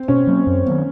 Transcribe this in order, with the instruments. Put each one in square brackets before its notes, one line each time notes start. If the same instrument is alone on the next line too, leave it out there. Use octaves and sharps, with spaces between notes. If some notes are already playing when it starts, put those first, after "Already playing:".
Already playing: [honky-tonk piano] C4
[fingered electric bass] B2 [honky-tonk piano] C#4
[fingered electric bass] F#3 A#3
F#2
D#3 F#3 B3